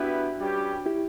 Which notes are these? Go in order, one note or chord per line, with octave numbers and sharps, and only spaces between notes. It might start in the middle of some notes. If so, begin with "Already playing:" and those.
Already playing: B3 D4 E4 F#4 G4 B4 E5
G3 C#4 G4 B4
E4 G4